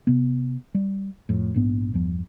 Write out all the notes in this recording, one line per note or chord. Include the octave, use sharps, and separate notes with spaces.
C3 B3
G3
F2 A2
A#1 G#2 B3
G1 E2 F3